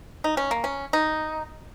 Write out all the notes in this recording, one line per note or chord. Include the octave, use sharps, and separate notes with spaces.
D#4
C#4
A#3
C#4
D#4